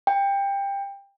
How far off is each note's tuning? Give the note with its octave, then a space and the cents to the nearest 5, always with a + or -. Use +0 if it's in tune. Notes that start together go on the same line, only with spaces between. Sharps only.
G5 +20